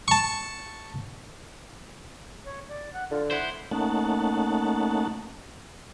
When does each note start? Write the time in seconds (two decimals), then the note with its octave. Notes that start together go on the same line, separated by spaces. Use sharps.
0.08 A5 C#6
2.45 C#5
2.69 D5
2.93 F#5
3.11 D3 F4
3.31 E4 C5 F#5
3.71 A3 A#3 C#4 D#4 F#5 A5